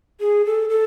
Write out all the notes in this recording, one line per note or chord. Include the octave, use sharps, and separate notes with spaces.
G#4
A4
A4